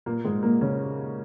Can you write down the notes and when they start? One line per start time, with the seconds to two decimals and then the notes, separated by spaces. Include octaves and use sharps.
0.06 A#2 A#3
0.25 G#2 G#3
0.43 A#2 A#3
0.61 C#3 C#4